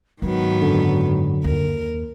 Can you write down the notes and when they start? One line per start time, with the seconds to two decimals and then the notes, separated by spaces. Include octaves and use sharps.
0.22 G#2 D#3 F#3 B3
0.62 F#2 D3
1.44 D#2 A#4